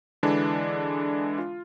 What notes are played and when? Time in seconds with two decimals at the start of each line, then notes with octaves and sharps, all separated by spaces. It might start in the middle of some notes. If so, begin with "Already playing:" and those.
0.23 D3 E3 G#3 D4
1.38 F4